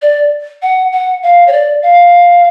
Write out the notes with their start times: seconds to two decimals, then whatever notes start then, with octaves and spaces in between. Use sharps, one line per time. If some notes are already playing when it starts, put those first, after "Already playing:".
0.02 D5
0.62 F#5
0.92 F#5
1.23 F5
1.47 C#5
1.53 D5
1.83 F5